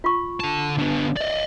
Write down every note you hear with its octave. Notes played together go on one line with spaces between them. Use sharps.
F4 C#6
D3 A5
D3 B3
D5 D#5